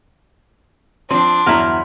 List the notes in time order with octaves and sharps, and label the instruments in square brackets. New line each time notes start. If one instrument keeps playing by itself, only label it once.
[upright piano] F3 [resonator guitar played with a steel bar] C4 [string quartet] D4 [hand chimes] C6
[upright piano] G1 E2 F6 [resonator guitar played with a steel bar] F#3 E4 A#5